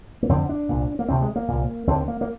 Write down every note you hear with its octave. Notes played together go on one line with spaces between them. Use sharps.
A#3
F2 D3 C4
D4
C2 A#2
A#3
D2 C3 C4
G#3
A#3
C2 A#2
D#2 D3 C4
A#3
A#3